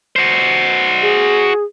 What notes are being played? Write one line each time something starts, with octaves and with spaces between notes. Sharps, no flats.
F#4 C5
G#4